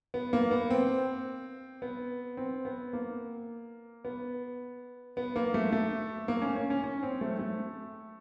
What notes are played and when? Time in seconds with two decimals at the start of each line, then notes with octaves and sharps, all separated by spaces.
0.14 B3
0.33 A#3
0.51 B3
0.70 C4
1.82 B3
2.37 C4
2.65 B3
2.93 A#3
4.05 B3
5.17 B3
5.36 A#3
5.54 A3
5.72 A3
6.28 A#3
6.42 C#4
6.56 C#4
6.70 C#4
6.84 C#4
7.03 C4
7.21 A3
7.39 A3